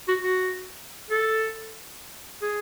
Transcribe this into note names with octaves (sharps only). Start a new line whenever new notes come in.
F#4
F#4
A4
G#4